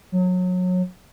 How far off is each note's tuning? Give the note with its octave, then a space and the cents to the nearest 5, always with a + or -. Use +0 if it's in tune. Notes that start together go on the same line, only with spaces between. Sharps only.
F#3 -25